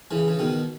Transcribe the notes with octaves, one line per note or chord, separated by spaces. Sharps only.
C#3 E3
C#3
B2 D#3